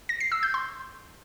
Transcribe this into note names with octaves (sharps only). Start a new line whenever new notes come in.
A#6
C7
E6
G6
C6